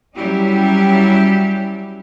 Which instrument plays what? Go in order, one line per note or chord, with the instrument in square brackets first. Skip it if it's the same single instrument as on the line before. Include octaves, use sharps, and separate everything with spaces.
[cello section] F#3 G3 C#4 E4 G4